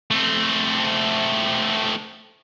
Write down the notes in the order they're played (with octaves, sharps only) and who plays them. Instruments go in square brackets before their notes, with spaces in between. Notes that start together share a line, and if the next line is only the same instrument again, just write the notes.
[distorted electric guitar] A3 C4